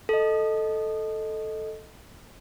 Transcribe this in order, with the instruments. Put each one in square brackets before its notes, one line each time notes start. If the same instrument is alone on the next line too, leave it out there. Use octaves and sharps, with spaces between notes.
[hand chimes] A4 D#5